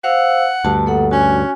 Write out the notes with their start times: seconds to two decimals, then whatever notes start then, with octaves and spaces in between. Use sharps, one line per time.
0.04 C5 F5 F#5 E6
0.65 D2 G2 A5
0.86 A#3 A4 F#5
1.11 C#4 F#4 G#5